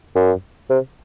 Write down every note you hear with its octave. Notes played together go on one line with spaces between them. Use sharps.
F#2
C3